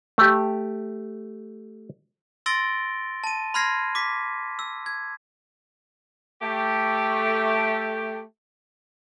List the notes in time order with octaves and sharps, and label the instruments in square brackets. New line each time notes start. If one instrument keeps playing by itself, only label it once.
[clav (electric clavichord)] A3 G4
[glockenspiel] C6 E6 A6 A#6 D7 G7
A5 D#7
B5 C6 F6 G#6 A#6 C7
D6 B6
E6
G#6
[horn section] A3 G4